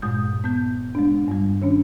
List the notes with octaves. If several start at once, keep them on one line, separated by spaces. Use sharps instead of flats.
G2 A#2 G#3 D#6 G6
B3 G6
G#3 D4
G2 G3
D#3 C#4 D4